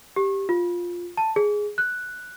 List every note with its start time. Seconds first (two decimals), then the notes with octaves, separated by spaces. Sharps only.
0.16 G4
0.49 F4
1.17 A5
1.36 G#4
1.78 F#6